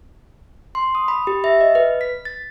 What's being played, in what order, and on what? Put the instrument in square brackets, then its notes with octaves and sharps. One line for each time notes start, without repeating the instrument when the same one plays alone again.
[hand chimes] C6
D#6
B5
G4
E5
D#5
B4
B6
A6